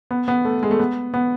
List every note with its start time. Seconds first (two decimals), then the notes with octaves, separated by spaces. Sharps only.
0.11 B3
0.28 B3
0.45 A3
0.63 G#3
0.71 A3
0.79 B3
1.14 B3